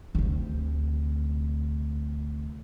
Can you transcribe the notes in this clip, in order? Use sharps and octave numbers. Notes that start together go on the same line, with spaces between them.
D2 C3